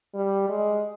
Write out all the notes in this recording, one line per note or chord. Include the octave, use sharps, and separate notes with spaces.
G3
G#3